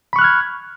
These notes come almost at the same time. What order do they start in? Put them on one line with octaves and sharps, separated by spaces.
B5 C#6 F#6 F6 G#6